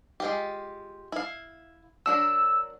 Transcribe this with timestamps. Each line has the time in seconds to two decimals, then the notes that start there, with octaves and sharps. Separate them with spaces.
0.20 G#3 F4 G4
1.12 E4 F5
2.06 F#3 D4 A#4 E6